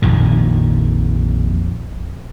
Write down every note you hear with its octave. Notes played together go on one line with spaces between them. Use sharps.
A#1 F2 A#2 D#3